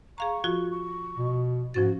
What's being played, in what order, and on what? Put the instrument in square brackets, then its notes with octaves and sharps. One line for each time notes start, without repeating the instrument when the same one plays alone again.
[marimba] G#4 F5 A#5 [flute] C#6
[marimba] F3 F4 F#4
[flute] C#6
[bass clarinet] B2
[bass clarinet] G#2 [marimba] F3 C#4 A6 [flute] F#4